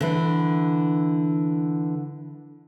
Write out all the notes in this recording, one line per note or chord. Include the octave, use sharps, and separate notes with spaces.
D3 E3